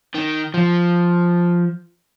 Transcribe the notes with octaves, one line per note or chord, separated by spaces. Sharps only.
D#3
F3